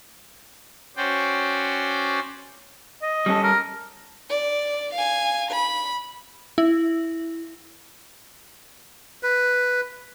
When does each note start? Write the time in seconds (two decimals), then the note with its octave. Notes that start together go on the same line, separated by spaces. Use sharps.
0.97 C#4 F#4 C5 D5 G5
3.02 D#5
3.26 G3 C#4 A4
3.43 A#4
4.30 D5
4.94 F5 G#5
5.51 B5
6.58 E4
9.23 B4